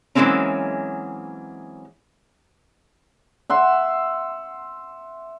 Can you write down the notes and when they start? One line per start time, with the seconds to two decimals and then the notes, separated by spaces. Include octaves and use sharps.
0.15 E3 F#3 G#3 A#3 C4 C#4
3.50 E5 F#5 C6